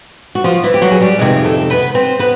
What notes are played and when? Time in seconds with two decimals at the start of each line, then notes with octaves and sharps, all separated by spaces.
0.35 F#4
0.44 F3 F4
0.64 E3 E4
0.74 G4
0.82 F#3 F#4
0.91 G#4
1.01 G3 G4
1.19 F2 C3 D#3 G#3 G#4
1.44 A3 A4
1.70 B3 B4
1.95 C4 C5
2.19 B3 B4